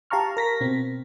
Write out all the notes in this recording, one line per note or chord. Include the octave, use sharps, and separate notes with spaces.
G4 F5 A5 A#5 C#6 F6
A#4 A#6 B6
B2 C4